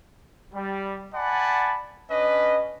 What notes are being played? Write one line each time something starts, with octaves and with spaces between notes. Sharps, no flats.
G3
D5 F#5 G#5 A5 B5
C#4 D4 B4 D#5